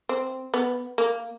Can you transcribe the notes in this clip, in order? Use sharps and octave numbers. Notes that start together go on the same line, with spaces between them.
C4
B3
A#3